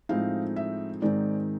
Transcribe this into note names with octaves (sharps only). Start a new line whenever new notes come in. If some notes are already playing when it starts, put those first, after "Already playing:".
A2 F3 G#3 C4 D#4 F5
E5
G#2 D#3 G#3 C4 D#4 D5